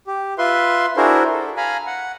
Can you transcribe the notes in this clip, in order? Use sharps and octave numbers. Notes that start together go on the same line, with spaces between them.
G4
F4 B4 E5 C6
D4 E4 F#4 G#4 A#4 C5
A4
F5 G#5 A#5 B5
F#5